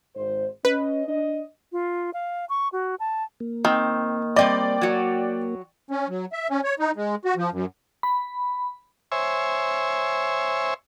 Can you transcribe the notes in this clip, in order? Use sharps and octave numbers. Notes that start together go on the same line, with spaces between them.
G#1 C5
C#4 B4 D#5
D4 D#5
F4
F5
C#6
F#4
A5
A#3
D#3 C4
G3 C4 D5 D#5 G5
F#3 F#4
C#4
F#3
E5
C#4
C#5
D#4
G#3
F#4
F3
F#2
B5
C5 C#5 E5 G#5